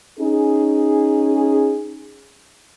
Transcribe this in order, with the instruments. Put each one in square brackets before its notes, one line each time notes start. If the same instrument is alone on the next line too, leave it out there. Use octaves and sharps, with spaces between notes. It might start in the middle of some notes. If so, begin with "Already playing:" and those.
[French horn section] C#4 D#4 G#4